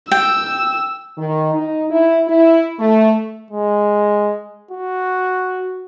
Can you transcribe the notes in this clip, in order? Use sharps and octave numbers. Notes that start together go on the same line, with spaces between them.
G5 E6
D#3
D#4
E4
E4
A3
G#3
F#4